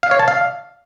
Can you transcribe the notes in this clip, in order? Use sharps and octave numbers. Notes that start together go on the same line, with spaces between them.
F5
C#5
A5
F5